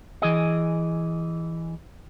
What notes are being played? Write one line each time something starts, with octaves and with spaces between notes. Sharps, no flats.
E3 G#4 D#5